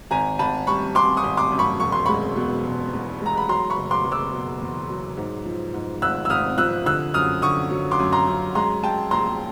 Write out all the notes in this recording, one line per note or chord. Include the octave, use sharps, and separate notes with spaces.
G#1 G#5 A#5
G#1 A5 B5
G3 B5 C#6
G3 C6 D6
C#6 D#6
G#1
C6 D6
F#2
B5 C#6
E1 C#6
C6
G#3 B5 C#6
B2
E1
E2
G#3 A#5
B5
F#3 A#5 C6
B5 C#6
F#1
C6 D6
F#1
D6 E6
B2
E2
F#3
G#2
F3
G#2
G#1 E6 F#6
E6
G#1 D#6 F6
F3 E6 F#6
D3 E6 F#6
F#2 D#6 F6
D3 C#6 D#6
F#3
C6 D6
F#2
A#5 C6
F#2
G#3 A#5 C6
G#3 G5 A5
A#1 A#5 C6